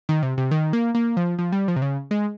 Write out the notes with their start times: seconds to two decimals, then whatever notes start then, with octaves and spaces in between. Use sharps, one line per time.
0.09 D#3
0.23 C3
0.38 C3
0.51 D#3
0.73 A#3
0.95 A#3
1.17 F3
1.39 F3
1.52 G3
1.68 F3
1.76 C3
1.82 C#3
2.11 G#3